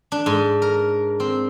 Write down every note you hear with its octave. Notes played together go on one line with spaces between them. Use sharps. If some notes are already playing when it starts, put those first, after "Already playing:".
D4
G#2
A#4
C4